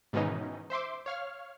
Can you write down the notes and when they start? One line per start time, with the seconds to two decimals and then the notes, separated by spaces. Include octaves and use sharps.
0.13 G#2 B2 D#3 E3 C#4 D#4
0.70 C5 E5 C6 D6
1.06 C#5 F5 F6